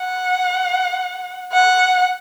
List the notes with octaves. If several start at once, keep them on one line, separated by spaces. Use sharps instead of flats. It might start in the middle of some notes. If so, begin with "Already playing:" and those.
Already playing: F#5
F#5